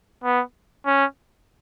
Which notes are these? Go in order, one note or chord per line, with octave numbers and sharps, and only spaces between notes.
B3
C#4